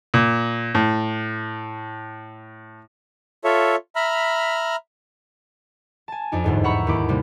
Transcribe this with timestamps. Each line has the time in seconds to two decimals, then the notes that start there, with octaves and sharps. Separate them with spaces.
0.14 A#2
0.75 A2
3.44 F4 A4 C#5 E5
3.96 E5 A#5 B5 F6
6.08 G#5 A5
6.32 F2 D4 D#4
6.44 G1 E2 G#2
6.64 E5 F#5 A#5 B5 C#6 E6
6.87 D#2 E4 D6
7.09 C3 G3 A#3